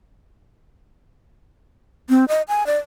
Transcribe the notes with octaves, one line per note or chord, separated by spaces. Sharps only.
C4
D#5
G#5
D5